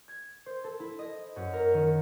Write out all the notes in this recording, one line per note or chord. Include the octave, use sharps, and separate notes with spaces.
G#6
C5
A4
E4
D#5
F#2
A#4
D#3